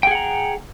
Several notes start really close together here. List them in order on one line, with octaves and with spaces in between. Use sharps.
G5 G#4 F#5 A#5